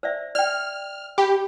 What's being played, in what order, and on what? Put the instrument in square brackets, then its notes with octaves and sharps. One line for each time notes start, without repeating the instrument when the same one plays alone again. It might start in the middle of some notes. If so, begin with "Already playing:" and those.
[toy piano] C5 D5 E5
[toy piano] D5 G5 [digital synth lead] F6
[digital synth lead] G4 [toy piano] G5 B5